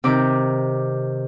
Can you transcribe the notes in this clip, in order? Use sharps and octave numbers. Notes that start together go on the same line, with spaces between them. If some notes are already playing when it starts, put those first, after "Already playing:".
C3 D#3 D6